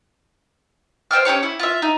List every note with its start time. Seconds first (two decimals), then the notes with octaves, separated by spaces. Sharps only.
1.11 C5 E5 G5 F6
1.25 C#4 E4 G4 C#5
1.43 E4
1.59 F4 E5
1.82 D#4